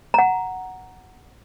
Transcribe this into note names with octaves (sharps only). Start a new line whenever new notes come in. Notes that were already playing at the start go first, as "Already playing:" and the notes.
F#5 A#5